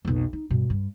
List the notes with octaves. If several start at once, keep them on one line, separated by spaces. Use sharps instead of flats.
B1 F2
D#4
G2 B2
G2